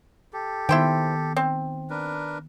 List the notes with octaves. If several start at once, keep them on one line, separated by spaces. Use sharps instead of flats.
G4 A4
D#3 B3 E4 C5 G5
C4
D4 A#4 B4